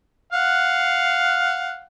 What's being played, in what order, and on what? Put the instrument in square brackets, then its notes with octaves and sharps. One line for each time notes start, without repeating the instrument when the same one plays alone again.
[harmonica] F5 F#5